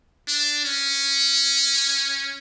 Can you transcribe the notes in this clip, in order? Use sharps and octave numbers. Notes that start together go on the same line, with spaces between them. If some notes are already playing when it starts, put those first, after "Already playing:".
D4
C#4